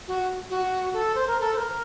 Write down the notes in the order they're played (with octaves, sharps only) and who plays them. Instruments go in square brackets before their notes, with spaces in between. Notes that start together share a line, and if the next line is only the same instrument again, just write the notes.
[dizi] F#4
F#4
A4
C5
A#4
A4
C5
A#4